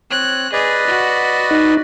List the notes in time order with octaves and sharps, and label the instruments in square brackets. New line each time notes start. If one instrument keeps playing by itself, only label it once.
[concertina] C4 C#5 [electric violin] F#6
[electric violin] G#4 [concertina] B4 D5 D#5
[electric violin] F#4
[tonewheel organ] D#4